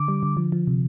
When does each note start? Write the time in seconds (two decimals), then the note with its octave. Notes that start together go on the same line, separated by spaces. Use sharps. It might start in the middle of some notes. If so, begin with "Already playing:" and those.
Already playing: D3 D6
0.08 G3
0.23 D3
0.37 F3
0.52 F3
0.67 C3